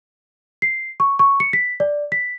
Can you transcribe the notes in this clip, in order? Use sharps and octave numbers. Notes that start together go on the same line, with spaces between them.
C7
C#6
C#6
C#7
B6
D5
B6